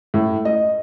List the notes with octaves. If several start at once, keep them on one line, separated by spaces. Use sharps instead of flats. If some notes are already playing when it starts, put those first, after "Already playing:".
A2
D#5